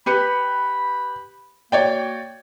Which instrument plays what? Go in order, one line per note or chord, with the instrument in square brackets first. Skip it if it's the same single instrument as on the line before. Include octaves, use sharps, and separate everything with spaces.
[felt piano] G4 B4 C#7 [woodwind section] B5
[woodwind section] A#3 F#4 [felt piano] C#5 D5 G5